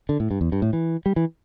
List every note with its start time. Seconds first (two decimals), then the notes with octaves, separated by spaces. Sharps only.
0.09 D3
0.20 A2
0.31 G2
0.41 E2
0.52 G2
0.62 A2
0.73 E3
1.06 G3
1.16 E3